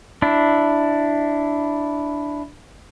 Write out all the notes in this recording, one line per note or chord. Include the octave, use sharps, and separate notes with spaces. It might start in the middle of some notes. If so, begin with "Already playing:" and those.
D4 E4